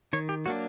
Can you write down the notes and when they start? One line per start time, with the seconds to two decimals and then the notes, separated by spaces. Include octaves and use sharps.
0.13 D#3 C#5
0.29 G4
0.46 F#3 A#3 D4 F#4